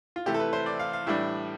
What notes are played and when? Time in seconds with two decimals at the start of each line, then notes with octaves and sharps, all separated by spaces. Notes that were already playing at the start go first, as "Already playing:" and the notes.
0.16 F4
0.26 C3 E3 A3 E4 G4
0.34 A4
0.40 B4
0.53 C5
0.66 D5
0.80 F5
0.93 F5
1.06 A2 E3 G3 D4 E5